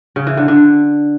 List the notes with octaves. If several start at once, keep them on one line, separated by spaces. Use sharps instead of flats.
C#3
E3
D3
D3